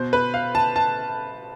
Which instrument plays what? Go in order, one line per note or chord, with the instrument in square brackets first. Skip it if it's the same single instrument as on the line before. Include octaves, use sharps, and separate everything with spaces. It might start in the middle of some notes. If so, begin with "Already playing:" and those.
Already playing: [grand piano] B2 C5
B4
F5
A5
A5